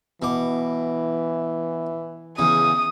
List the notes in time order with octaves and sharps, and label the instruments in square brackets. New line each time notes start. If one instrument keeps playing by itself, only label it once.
[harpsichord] B2 D6 [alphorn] E3
[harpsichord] E2 C#3 [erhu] D#6